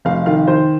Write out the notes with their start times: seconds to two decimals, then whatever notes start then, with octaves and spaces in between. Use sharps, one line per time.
0.05 F1 F5
0.26 D#3 F5
0.47 D#3 C5